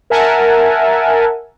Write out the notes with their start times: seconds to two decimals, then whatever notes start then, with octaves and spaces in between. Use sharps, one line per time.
0.10 A#4 E5 F#5 G#5 A5